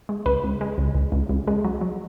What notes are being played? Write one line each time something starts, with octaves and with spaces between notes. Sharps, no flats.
G#3
C#2 B4
C#2
G#3
C#2
C#2
C#2
C#2
G#3
F#3
F#3